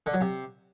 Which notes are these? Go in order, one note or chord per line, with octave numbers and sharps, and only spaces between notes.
D3
F#3
C3